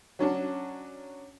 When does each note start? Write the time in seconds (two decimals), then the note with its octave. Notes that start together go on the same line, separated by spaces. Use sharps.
0.19 F#3 C#4 D4 F#4